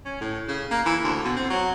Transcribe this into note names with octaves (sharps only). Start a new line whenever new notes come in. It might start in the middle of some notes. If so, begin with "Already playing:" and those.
C#4
A2
C#3
A#3
E3
D2
B2
C4
F#3